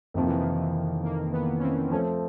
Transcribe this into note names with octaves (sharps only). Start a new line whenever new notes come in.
F2 C3 D#3 F3 A#3
E3
D#3
E3
A#3
B3
C#4
C4
F3 A3 C4 C#4